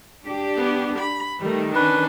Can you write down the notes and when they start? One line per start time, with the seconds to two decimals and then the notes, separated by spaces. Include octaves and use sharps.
0.24 D4 G4
0.57 B3
0.99 B5
1.40 D#3 G3 A3
1.75 C#4 D4 B4